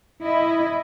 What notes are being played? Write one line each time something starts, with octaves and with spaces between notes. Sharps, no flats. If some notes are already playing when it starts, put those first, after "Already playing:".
E4 D#5